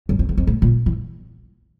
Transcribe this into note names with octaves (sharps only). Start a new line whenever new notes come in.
F#2
F2
E2
F2
A2
A#2
E3